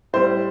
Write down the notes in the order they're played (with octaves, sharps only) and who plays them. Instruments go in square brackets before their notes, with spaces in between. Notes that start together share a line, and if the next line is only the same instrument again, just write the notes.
[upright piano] A2 G3 C4 C5